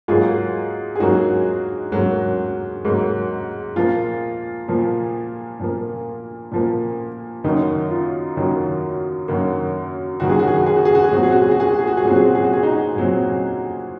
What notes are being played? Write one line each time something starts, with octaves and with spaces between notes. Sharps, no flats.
G#2 F#3 A#3 F4 G#4
G#4
G#2 F#3 A#3 D#4 F#4
G#2 F#3 A#3
G#2 F#3 A#3
A#2 F3 A#3 F4
A#2 F3 A#3
A#2 F3 A#3
A#2 F3 A#3
F#2 D#3 F#3 A#3 D#4
F4
F#2 D#3 F#3 A#3
F#2 D#3 F#3 A#3
F#2 D#3 F#3 A#3 F#4
G#4
F#4
G#4
F#4
G#4
F#4
G#4
F#4
G#4
A#2 F#3 C4 F#4
G#4
F#4
G#4
F#4
G#4
F#4
G#4
F#4
G#4
A#2 F#3 C4 F#4
G#4
F#4
G#4
F#4
G#4
D#4 F#4
A#2 F#3 C4